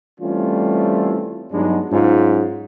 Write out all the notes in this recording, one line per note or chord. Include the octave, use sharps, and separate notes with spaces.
E3 G3 A3 C4 C#4 F4
G2 F#3 G#3 B3 D4 D#4
G#2 F#3 G#3 C#4 F4